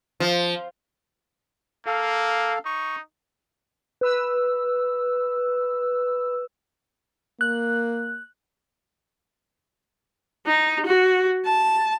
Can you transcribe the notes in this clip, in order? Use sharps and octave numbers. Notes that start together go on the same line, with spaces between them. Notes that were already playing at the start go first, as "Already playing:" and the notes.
F3
A#3 A4 F5
D#4 C#6
B4 E6
A#3 F#6
D#4
F#4
A5